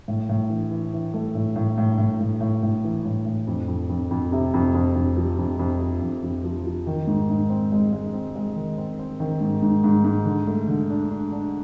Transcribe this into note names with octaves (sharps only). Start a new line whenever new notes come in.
A2
A2
E3
E3
E3
A3
A2
A2
A2
A2
A2
A2
A2
E3
A2
A2
F2
F2
F2
F2
C3
F2
F2
F2
F3
F2
F2
F3
F2
F2
F3
F3
D#3
G#2
G#2
C4
G#3
G#3
C4
G#3
D#3
C4
C4
D#3
G#2
G#2
G#2
G#2
D3
A3
D3
D4
D4
D4